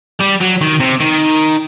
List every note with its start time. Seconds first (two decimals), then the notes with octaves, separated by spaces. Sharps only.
0.21 G3
0.41 F#3
0.61 D#3
0.80 C3
1.00 D#3